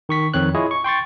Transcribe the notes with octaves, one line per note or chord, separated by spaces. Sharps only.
D#3 C#6 B6
F2 D#3 C4 C#5 F#6
E4 F4 G#4 C#5 D#5
C#6
G5 C6 C#6 A6